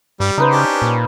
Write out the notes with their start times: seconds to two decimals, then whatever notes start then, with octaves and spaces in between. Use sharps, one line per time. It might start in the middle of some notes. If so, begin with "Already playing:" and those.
0.20 G2 G3
0.38 C#3 D#4 B4 C5
0.51 C#4 D4 G4
0.82 A#2